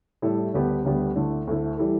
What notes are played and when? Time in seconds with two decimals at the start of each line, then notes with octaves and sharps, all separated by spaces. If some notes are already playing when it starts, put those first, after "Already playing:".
0.22 A2 G3 E4 A4
0.54 D2 D3 G3 B3 G4
0.85 D2 D3 G3 B3 G4
1.16 D2 D3 A3 E4
1.47 D2 D3 A3 E4
1.77 E3 G3 E4 A4